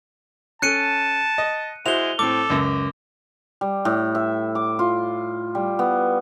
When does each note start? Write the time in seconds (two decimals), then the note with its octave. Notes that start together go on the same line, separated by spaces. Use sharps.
0.62 C#4 A4 A5 F#6 C#7 D#7
1.38 D#5
1.86 G#3 E4 F#4 C5 F7 G7
2.19 A2 C4 A4 D6
2.50 C#2 F#2
3.61 G3
3.85 A2
4.15 E5
4.55 D6
4.79 F4
5.55 G3
5.79 B3